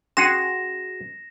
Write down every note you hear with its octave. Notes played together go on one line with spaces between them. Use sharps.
C#4 F#4 G#4 C6 A#6 E7